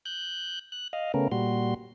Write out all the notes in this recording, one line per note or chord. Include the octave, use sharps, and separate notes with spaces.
F#6 G6
F#6
D#5 F5
C#3 A3 B3 C#4 A#4
A#2 G3 F#4 C6